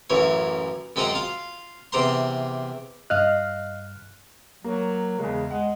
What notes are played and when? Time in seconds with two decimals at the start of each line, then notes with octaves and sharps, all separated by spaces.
0.10 A1 F#2 E3 C#5
0.96 F#2 G#3 C4 D#5 F#5 A#5
1.15 F4 F5
1.92 E2 C3 D4 C5 A#5 C6
3.10 G2 D#5 F5 F6 F#6
4.64 F#3 A#3
5.19 E2 C#3 G#3
5.51 G#3 F#5